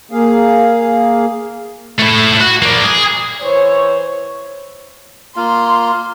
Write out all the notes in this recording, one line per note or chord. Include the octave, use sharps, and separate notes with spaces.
A#3 G#4 F5
A3 E4
F#4
A#3 D4
G#4
E3 C5 C#5
A#3 F4 F5 C6